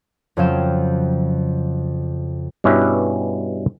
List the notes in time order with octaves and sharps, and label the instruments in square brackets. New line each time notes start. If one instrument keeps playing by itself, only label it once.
[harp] F2 C#3 F#3 F5 G5 E7
[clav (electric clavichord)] G2 B2 C#4 E4 G4 B4